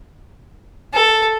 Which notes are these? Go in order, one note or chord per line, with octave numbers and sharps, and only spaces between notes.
A4